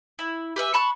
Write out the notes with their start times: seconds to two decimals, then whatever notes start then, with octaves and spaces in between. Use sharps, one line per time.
0.19 E4
0.56 G4 B4 E5 G#5
0.74 A5 B5 C#6 F#6